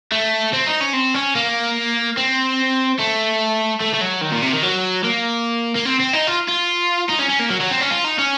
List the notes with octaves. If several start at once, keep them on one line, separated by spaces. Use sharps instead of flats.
A3
C4
D#4
C#4
C4
C#4
A#3
C4
A3
A3
A3
F#3
D#3
A#2
C3
D#3
F#3
A#3
A#3
C4
C4
D#4
F4
F4
D#4
C#4
C#4
A#3
F#3
F#3
C4
C#4
F4
D#4
C#4